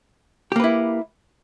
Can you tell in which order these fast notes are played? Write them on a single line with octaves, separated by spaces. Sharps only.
G4 A#3 B4 E4